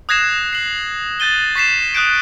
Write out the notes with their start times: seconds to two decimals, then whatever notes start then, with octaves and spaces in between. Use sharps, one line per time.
0.09 D#6 F#6 G#6 A#6 C7 E7
0.53 C7 F#7
1.20 F#6 G6 A6 D#7 G7
1.56 C#6 B6 C7 E7
1.95 D#6 F#6 G6 D7